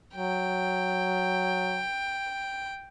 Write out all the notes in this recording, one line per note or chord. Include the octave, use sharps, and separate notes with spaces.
F#3 G5